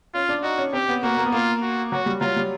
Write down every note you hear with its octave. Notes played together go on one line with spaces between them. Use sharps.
C#4 F4
D4
D#4 F#4
C#4
C4 G4
B3
A#3 F#4
A#3
B3
A#3 F4
F#4
F#3 F#4
G3
F#3 F4
G3